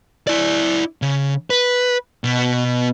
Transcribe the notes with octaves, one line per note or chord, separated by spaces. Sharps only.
E4 D5
C#3
B4
B2 B3